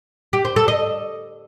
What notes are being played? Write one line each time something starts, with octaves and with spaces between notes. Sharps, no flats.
G4
C5
A4
D#5